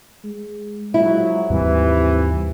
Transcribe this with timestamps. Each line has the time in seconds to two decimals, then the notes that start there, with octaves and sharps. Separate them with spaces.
0.24 G#3
0.94 F3 F#3 E4
1.50 D#2 G#2 C3 E3 G3